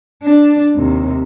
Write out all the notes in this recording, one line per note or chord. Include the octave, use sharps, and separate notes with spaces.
D4
D#2 C3